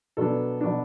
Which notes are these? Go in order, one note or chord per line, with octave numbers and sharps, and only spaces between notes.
B2 F#3 B3 D4 A4
B2 F#3 B3 D4